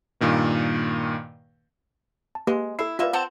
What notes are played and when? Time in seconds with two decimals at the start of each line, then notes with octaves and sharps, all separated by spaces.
0.21 G2 A#2 D#3 A#3
2.35 A5
2.47 G#3 A#3 G4 B4
2.79 E4 A4 C7
2.99 G3 A#3 F4 B4 E5
3.13 C4 F#5 A5